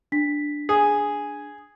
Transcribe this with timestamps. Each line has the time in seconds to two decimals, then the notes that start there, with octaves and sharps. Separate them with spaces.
0.12 D4 B6
0.69 G#4